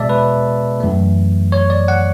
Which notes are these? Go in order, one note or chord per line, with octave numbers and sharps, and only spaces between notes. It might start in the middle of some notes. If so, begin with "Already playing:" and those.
Already playing: B2 G#3 B3 D5 E5 A5
B4
F#2 E3 A3
C#5
D5
F#5